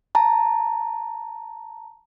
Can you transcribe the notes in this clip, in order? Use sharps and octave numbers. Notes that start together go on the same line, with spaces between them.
A5 A#5